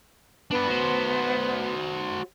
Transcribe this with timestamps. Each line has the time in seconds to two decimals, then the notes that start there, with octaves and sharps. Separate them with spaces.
0.51 B3 D4 B4
0.67 F#4 C5